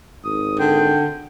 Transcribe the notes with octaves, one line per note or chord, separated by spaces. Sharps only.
G#1 D#6
D3 G5